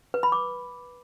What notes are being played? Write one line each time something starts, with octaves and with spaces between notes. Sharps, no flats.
B4
B5
D6